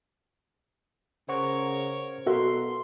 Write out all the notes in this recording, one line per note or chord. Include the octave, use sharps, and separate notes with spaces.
C#3 A#4 C5 C#5 F#5 C#6
B2 F#4 A4 A#4 E5 C6